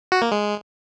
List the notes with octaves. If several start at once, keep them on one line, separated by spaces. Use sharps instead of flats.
F#4
A#3
G#3